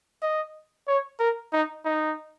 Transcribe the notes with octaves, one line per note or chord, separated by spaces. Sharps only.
D#5
C#5
A#4
D#4
D#4